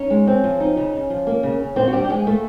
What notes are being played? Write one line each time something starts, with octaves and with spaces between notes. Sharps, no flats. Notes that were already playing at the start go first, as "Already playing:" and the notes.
Already playing: C#4 D#4 C#5
G#3
C4
F3
D#4
C#3
C#3
F3
A#3
C#3
C#3
A#2 C4 C5
F#4
G3 D4 G4
G4
F3 G#3 G#4
A3 A#3 A4